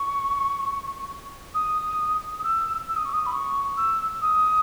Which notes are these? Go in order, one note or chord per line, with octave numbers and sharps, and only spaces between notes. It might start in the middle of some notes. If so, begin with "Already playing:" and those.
Already playing: C#6
D#6
D#6
E6
E6
D#6
C#6
D#6
B5
C#6
E6
D#6